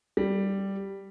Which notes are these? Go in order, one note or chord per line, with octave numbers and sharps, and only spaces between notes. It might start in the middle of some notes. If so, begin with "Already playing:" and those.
G3